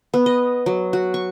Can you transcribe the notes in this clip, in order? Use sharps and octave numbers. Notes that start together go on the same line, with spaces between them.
B3
D#5
F#3
F#4
C#6